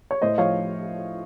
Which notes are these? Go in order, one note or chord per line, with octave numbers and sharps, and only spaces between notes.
C#5
A2 C5 D#5
F3 C#5 F5